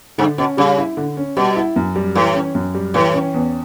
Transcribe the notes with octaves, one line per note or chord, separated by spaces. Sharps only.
G2 D3
B2 C#4
C#3 G3
E4
D3
C#4
B2 G3
E4
F#2
G3
A2 E3
C#4
F#2
G3
A2 E3
C#4
E2